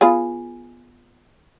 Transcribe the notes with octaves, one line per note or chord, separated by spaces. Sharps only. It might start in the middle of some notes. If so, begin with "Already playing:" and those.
B3 F4 G#4